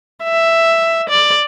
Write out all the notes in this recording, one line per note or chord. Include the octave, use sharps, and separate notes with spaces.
E5
D5